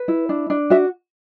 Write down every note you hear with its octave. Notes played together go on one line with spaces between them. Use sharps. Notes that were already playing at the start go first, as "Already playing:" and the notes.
Already playing: B4
E4
D4
D4
F#4 E5